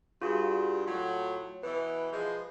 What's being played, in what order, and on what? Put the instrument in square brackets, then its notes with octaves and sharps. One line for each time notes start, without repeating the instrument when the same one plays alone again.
[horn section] G2 [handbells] F4 F#4 G#4
[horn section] A2 F#3 [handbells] F4
[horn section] B2 E3 [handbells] B4
[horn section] F3 G#3